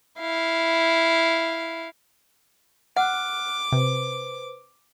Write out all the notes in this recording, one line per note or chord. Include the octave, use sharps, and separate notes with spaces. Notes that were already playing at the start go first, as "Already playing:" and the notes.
E4 F5
F#5 D6 F6 F#6
C3 B4 C5